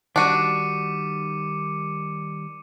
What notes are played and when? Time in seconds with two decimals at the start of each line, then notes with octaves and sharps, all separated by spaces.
0.16 D#3 G3 D4 F#4 D6 C#7 D#7